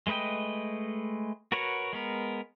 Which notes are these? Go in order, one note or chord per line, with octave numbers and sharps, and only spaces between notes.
G#3 A3 B4 D#5 G5
F#4 A#4 B4 C#5 F#5
G#3 B3 A#4